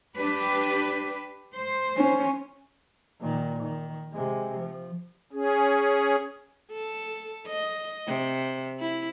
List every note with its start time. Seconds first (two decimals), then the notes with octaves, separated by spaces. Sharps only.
0.17 D4 G4 B4
1.56 C5
1.97 C#4
3.20 A#2 D#3
3.62 D#3
4.13 C3 G#3
4.58 F3
5.33 C#4 G#4
6.73 A4
7.47 D#5
8.07 C3
8.80 E4